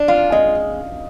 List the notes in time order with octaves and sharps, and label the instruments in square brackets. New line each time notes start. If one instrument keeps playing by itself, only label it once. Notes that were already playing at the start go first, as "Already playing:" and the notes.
Already playing: [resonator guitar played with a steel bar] D4
[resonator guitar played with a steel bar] F4 [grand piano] F5
[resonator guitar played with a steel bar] G#3 [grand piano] D#5